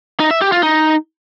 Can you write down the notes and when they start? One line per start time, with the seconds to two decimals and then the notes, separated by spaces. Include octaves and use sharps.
0.20 D#4
0.31 E5
0.41 G4
0.52 F4
0.63 D#4